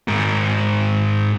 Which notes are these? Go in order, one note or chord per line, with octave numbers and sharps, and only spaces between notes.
G#2 A#4